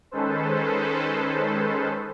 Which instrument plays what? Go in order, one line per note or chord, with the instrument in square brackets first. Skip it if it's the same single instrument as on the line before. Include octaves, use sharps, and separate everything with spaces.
[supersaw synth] D#3 G#3 C#4 A4 B4 C5